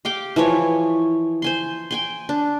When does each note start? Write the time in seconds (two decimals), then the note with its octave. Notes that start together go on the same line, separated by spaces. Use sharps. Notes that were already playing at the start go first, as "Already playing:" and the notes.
0.05 G4 F5 G5 D6
0.36 E3 F3 E4 C#5
1.42 C5 G#5 C6
1.91 G5 G#5 C6
2.29 D4